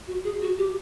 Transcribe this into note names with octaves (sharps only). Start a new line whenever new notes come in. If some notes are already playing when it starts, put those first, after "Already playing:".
F#4
G#4
F#4
G4